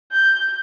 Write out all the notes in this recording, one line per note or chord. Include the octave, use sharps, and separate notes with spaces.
G6